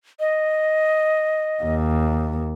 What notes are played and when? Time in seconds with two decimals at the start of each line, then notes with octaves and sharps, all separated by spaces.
0.20 D#5
1.63 D#2